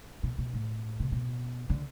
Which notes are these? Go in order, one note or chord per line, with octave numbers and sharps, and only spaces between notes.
B2
B2
A2
C3
B2
D3